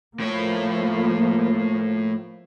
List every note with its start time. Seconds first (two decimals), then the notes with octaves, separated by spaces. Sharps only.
0.20 A2 F3 A#3 C#5